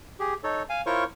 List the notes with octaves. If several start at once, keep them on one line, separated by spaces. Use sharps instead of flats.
G4 G#4
D#4 A4 C#5
F5 G#5
E4 F4 A#4 C5 C#5 C#6